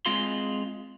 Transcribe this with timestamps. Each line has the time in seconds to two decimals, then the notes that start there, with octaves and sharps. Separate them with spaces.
0.06 G#3 C4 F4 G#4 F5 C6